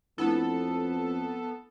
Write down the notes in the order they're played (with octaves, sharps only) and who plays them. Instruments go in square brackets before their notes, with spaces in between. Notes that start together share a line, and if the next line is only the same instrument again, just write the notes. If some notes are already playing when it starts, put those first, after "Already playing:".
[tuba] F2 [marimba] A3 D4 E4 [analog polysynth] B3 A4